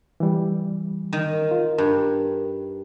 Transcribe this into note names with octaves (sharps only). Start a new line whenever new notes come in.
E3 G3
D#3
F4
G2 A#4